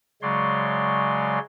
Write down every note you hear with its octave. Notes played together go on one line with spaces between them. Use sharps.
C#3 F#3 G#3 C#5 D5 C6